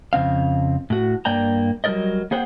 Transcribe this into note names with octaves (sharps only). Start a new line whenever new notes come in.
F2 C#3 C4 F5
A2 F#4
G2 A#3 D5 G5 A#5
F#3 G3 A#3 A#4 D5 D#5
A#3 G#4 C5 F#5 G5